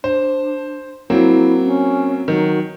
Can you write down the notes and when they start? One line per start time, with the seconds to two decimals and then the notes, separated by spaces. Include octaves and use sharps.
0.04 D4 C5
1.10 F#3 A#3 C4 E4
1.66 C#4
2.28 D#3 F#3